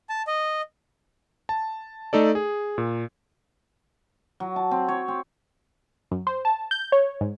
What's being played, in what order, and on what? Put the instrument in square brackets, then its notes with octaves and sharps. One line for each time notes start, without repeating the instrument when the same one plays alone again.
[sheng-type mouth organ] A5
D#5
[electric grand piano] A5
A3 D#4 A4 D5
G#4
A#2
[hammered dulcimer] F#3
A5
C4
C#5
C4
[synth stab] F#2
C5
A5
G6
C#5
G#2